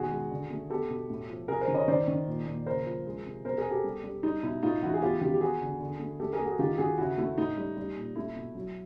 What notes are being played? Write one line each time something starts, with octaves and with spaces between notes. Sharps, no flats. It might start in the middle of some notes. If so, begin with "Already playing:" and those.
Already playing: B2 D#3 F#4 G#4
G#3
D3
A3
B3 G4 A4
B2
A2
F3
C3 G#4 A#4
A#4 C5
D#3
C#5 D#5
D#3 C5 D5
D#3
A#2
A#2
C#3 A#4 C5
F3
G#3
C3
B2 A#4 C5
G#4 A#4
B3
G4 A4
G3
G3
G3 D#4
B2 E4
A2 D#4 F4
E3 E4 F#4
G#4
B3 F4 G4
D#3 F4 G4
G4
B3 F#4 G#4
D3
D3
A3
A3 G4 A4
G#4 A#4
A3
F#4 G#4
D#3 F4 G4
D#3 F#4 G#4
C#3 E4 F#4
A3 E4
A2 D#4
G3
G3
A#2
A3 E4
B2
F#3